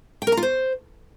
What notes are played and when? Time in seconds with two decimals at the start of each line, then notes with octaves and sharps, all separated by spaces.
0.22 G5
0.27 A#4
0.32 A#5
0.37 F4
0.43 C5